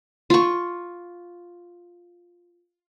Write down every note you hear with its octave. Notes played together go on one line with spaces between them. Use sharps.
F4 C#6